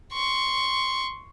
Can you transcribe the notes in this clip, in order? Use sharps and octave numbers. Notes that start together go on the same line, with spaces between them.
C6 C#6